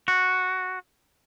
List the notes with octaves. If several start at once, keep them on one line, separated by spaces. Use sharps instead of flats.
F#4